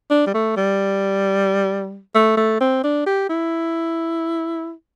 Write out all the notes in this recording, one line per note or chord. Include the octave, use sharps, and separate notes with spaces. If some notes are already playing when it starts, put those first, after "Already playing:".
D4
G3
A3
G3
A3
A3
C4
D4
G4
E4